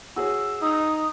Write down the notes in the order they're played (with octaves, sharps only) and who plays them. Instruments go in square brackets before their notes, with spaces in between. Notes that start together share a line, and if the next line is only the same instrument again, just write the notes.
[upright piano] F#4 G#4 C#5 [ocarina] E6
[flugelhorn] D#4 [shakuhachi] D#6